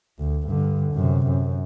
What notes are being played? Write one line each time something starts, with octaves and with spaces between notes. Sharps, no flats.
D2
G2 D3
F#2 C3
F#2